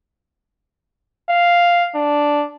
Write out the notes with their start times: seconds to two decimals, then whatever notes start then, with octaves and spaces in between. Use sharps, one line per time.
1.30 F5
1.95 D4